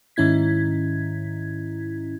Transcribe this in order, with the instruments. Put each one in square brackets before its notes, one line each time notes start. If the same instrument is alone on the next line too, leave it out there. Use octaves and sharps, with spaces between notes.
[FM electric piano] G#2 D#3 C#4 E4 G#6 B6